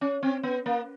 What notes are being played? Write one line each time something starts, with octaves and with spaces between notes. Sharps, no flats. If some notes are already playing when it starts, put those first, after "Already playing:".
C#4
C4
B3
A#3